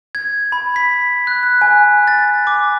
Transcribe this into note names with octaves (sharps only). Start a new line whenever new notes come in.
G#6
B5
B6
F#6
F#6
G#5
A6
D6